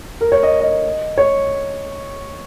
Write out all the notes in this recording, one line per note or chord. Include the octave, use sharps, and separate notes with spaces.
A#4
C#5
D#5
D#5
C#5